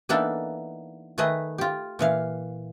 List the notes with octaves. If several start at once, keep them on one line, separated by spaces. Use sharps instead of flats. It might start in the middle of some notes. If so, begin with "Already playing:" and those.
E3 A#3 B3 D4 D#4 A4
D#3 A3 G#4 B4 D#5
F4 G4
A#2 E3 F5